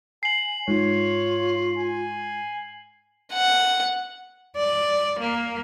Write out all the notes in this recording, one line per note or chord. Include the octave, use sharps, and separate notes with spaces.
G#5 C7 F#7
G#2 F4 C#5
G#5
F#5
D5
A#3